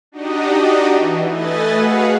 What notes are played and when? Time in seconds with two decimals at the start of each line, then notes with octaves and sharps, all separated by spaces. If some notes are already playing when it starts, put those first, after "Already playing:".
0.12 D4 D#4 F#4 G4 D#5
0.88 E3
1.29 A3 B4 D#5 G#5 A6
1.74 F#4 G#4 B4 F5 F#5